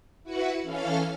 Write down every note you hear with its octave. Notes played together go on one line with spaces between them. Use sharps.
E4 F#4 B4 F#5
E3 C#4 A4 F5 F6